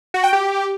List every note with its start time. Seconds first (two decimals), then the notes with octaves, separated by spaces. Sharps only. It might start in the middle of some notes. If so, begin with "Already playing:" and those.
0.14 F#4
0.23 G5
0.33 G4